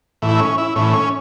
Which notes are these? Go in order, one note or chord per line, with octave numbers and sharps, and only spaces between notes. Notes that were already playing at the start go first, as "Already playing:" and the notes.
A2 E3
E4
C#4
E4
A2 E3 C#4
C#4